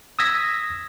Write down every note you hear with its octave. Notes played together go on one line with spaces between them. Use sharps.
D#6 E6 G#6 A#6 B6